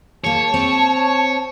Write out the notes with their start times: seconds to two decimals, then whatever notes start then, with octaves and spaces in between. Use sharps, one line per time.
0.24 A#3 G#4 C#5 A5
0.54 C4